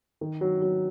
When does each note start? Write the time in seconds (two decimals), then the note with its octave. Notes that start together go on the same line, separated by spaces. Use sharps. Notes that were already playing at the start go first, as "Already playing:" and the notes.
0.21 D#3
0.41 F#3
0.62 F#3